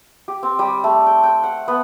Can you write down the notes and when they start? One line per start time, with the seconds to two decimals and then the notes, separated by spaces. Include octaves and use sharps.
0.28 G4
0.43 C4
0.59 G3
0.84 A3
1.06 G5
1.23 G5
1.43 F#5
1.68 B3